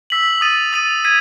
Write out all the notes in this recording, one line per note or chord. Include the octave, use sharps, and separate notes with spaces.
E6 B6 F#7
D#6 A6 D#7
D#6 A6 D#7
G#6 B6 D#7